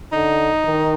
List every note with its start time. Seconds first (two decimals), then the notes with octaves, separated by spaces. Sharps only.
0.12 D3 D#4
0.65 D#3